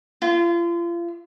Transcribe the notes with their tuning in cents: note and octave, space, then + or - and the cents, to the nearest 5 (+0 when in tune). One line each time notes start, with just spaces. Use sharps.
F4 -35